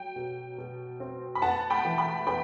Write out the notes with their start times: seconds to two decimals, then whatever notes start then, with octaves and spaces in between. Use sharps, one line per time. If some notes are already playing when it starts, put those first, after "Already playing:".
Already playing: F#3 G5
0.16 B2
0.58 B2
1.00 C4
1.35 B5
1.42 B3 F#5 A5
1.70 G5 B5
1.85 E3
1.98 G5 B5
2.27 B3 G5 B5